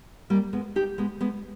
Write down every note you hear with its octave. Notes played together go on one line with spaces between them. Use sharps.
G3 A#3
G#3 B3
D#4 G4
G#3 B3
G#3 B3